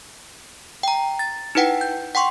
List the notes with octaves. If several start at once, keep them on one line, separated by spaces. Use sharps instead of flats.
G5 A#5
A6
D#4 E4 B4 F#5 G5
G6
F#5 G5 C6 C#6